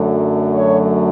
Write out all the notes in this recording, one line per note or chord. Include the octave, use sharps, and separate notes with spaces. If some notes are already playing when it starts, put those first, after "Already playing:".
Already playing: F#2 D3 F#3 A3
C#5